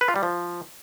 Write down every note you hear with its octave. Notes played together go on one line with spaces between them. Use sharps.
B4
F4
G3
F3